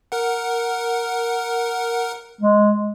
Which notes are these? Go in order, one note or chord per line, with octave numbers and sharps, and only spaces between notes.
A#4 F#5
G#3